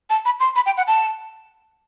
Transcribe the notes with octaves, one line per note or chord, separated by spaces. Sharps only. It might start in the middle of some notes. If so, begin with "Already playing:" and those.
A5
B5
C6
B5
G5
F#5
A5